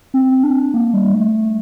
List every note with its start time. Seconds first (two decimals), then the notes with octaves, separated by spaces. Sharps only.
0.14 C4
0.44 D4
0.74 A#3
0.93 G3
1.14 A3